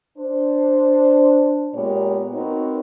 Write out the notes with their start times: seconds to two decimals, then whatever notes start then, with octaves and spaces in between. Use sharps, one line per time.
0.18 D4 C5
1.74 A#2 G#3 B3 G4 A#4 C#5
2.34 C4 D#4 F#4 A#4 B4 C#5